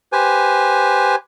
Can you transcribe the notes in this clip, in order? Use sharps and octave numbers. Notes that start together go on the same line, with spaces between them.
G4 B4 C5 G#5